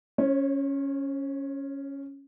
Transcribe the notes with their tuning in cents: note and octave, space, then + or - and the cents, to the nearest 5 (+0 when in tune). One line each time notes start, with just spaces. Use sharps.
C#4 +0 C#5 -45